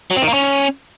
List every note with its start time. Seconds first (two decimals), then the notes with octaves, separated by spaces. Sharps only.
0.11 F#3
0.16 C4
0.22 D#3
0.28 A#3
0.34 C#4